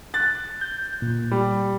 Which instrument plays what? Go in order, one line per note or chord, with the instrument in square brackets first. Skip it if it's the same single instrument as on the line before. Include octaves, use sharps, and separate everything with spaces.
[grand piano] F#6 A6
[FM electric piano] G6
A#2
[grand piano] G3